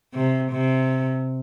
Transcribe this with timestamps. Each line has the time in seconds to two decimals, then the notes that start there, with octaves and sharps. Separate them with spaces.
0.14 C3
0.52 C3